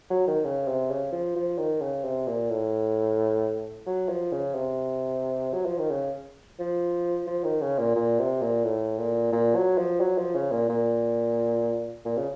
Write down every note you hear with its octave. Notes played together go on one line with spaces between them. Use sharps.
F#3
D#3
C#3
C3
C#3
F3
F3
D#3
C#3
C3
A#2
A2
F#3
F3
C#3
C3
F#3
F3
D#3
C#3
F3
F3
D#3
C#3
A#2
A#2
C3
A#2
A2
A#2
A#2
F#3
F3
F#3
F3
C#3
A#2
A#2
A#2
C#3